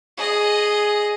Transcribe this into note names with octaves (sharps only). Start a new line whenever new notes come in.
G#4 D#5